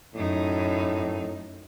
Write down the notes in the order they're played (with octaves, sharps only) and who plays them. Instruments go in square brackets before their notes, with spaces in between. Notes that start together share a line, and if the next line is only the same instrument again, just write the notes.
[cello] F#2 D#4 [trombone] A2